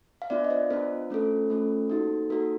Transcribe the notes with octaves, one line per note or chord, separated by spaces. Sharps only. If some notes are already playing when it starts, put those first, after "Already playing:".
F5
B3 D4 F4 D5 E5
D#5
C5 D5
B3 D4 F4 A#4 C5
A3 C#4 F4 A4
A3 C#4 F4 A4
A#3 D#4 F#4 A4
A#3 D#4 F#4 A4 A#4